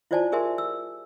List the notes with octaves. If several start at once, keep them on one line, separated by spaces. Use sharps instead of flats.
E4 F4 C5 D5 G#5 A5
G4 G#4 A#4 E5 G#5 C6
E6